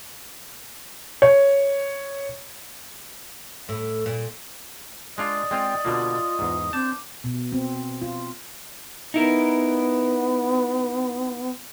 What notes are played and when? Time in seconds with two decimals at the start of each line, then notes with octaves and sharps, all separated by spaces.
1.22 C#5
3.69 A2
4.06 A#2
5.18 G#3 D4 F4 D5 D#5
5.51 G#3 C4 F4 G5
5.85 B2 D3 A#3 F4
6.39 E2 G#2
6.73 C4 D4 A5 G6
7.24 B2
7.52 C4
8.02 F4
9.14 B3 D#4 E4 A#4